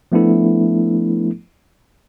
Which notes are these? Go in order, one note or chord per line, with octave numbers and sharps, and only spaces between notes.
F3 A3 B3 D4 E4 A4